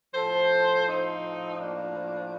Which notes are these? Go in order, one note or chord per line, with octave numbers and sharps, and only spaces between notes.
A2 F3 A4 C5
C4 D#4
A#3 D4